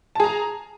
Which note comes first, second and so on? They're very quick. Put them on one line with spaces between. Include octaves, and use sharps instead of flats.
A5 G#4 A#5